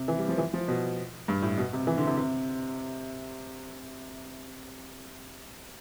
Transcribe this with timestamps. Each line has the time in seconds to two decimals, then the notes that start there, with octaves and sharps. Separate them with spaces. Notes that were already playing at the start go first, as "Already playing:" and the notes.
Already playing: C3
0.08 E3
0.18 G3
0.28 F3
0.38 E3
0.54 F3
0.68 B2
1.28 G2
1.42 A2
1.58 B2
1.73 C3
1.87 E3
1.98 D3
2.07 C3
2.17 C3